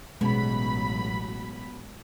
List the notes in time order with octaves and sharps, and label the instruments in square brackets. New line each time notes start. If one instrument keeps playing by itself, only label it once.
[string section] A1 F#3 B5 [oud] B2 [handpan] G#3 B3 C#4